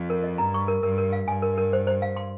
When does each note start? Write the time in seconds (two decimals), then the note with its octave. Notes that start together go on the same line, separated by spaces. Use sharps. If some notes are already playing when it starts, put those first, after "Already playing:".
Already playing: F2
0.10 A#4
0.24 D#5
0.38 G2 A#5
0.54 C#6
0.68 A#4
0.83 G2 A#4
0.98 A#4
1.13 F5
1.28 G2 G#5
1.42 A#4
1.58 A#4
1.73 C5
1.87 C5
2.02 F5
2.16 C6